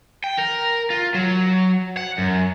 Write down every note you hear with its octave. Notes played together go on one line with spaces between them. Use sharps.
G5
A#4
F4
F#3
F#5
F#2